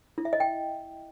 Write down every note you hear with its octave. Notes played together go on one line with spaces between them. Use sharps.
E4
E5
D#5
G5